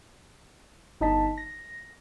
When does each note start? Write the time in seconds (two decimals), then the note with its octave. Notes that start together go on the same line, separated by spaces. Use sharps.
1.01 G1 D#4 D#5 A5 B6
1.38 A#6